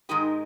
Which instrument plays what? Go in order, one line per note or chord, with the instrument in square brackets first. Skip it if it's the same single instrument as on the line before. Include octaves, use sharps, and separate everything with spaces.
[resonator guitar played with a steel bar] G#2 D#3 G#3 D#4 G4 A#4